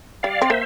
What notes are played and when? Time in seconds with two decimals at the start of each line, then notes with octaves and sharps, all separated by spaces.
0.23 G3 D5 F5
0.42 C4
0.50 A#3 C5 E5